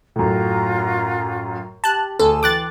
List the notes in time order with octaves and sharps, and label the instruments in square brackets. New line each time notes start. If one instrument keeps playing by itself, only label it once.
[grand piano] F#2 A2 [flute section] F4 F#4 A#5
[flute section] G4 [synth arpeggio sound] A5 F#6
[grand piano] D2 [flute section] G#4 G#5 E6 [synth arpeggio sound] A4
[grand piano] E3 [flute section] G5 C6 [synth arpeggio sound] D6 F#6 A6